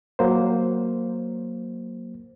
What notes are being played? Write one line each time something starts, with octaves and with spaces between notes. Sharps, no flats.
F#3 A#3 C5